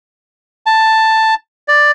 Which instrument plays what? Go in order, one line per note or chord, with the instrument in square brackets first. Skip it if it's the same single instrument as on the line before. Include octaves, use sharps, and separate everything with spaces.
[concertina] A5
D5